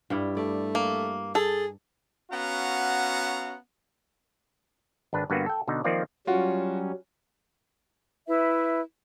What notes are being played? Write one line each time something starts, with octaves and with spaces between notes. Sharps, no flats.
G2 G3 E4
A3 D5
A#3
G#4 A4
B3 C#4 F#4 F5 F#5 A#5
G#1 D4 B4
G2 D3 A#3 B3 F#4 B4
A4 G5
B2 D3 B3 D#4
D#3 F3 A#3 C4 F4 D5
F#3 G3 C#4 F4 F#4 F#5
E4 B4 E5